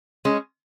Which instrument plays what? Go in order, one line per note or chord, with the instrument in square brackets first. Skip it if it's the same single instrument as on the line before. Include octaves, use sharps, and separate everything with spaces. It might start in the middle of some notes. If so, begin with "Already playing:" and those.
[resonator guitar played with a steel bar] G#3 C#4